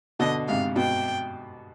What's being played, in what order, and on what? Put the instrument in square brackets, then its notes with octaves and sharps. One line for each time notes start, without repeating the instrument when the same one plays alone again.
[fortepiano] B2 D3 [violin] D#5
[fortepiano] G#2 C3 [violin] F5
[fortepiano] B2 [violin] G5